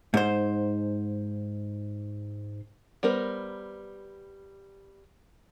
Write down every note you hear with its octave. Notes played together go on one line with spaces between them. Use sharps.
G#2 C5
G3 B3 A#4 C5